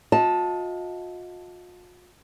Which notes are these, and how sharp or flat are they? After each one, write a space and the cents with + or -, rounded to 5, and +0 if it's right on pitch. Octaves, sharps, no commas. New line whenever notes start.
F4 +45 D#5 +30 A5 +0